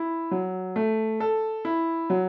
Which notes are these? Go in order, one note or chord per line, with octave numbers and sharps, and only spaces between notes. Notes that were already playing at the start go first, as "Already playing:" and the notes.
Already playing: E4
F#3
A3
A4
E4
F#3